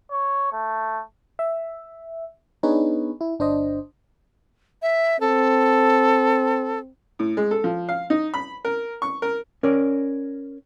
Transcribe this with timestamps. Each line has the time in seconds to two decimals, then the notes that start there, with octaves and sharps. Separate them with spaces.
0.11 C#5
0.53 A3
1.39 E5
2.63 B3 D4 D#4 G#4 B4 C#5
3.21 E4
3.39 G1 D4 C5 D#5
4.82 E5
5.20 C4 A4
7.19 A2
7.37 G#3
7.51 A4
7.64 F3
7.89 F5
8.10 D#4
8.34 B5
8.65 A#4
9.02 C#6
9.22 A#4
9.63 C#4 A#4 D5